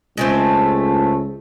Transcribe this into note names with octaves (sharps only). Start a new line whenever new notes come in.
C#2 G#3 A3 C4